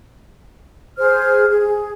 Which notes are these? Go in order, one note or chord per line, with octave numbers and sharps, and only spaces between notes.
G#4 C5 F6
G#4